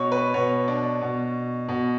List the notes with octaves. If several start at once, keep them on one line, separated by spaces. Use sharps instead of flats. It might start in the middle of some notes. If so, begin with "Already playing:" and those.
Already playing: B2 C#5
B4
B2 C#5
D4
B2
B2